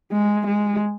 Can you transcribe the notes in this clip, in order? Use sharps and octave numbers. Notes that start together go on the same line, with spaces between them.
G#3
G#3